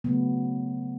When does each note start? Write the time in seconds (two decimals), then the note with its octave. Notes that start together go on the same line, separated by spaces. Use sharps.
0.04 C#3 F#3 A3 B3